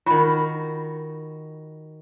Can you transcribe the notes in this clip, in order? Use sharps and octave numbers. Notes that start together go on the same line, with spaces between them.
D#3 F4 F#4 B5